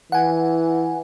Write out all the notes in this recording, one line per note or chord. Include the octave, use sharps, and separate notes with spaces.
E3 F#5 G#5